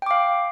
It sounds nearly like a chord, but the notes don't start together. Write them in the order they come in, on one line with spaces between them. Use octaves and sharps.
G5 D6 F5